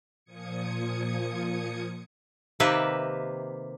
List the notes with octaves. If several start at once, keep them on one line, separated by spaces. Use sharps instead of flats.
A#2 F3 D#6 G#6 C#7
C3 D#3 A#3 G4 B4 E5